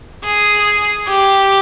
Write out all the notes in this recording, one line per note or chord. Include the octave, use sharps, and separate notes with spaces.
G#4
G4